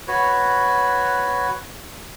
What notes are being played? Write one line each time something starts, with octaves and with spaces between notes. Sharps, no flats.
F#4 B4 C#5